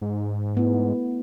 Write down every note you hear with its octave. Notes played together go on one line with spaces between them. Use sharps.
G#2
A3 B3 E4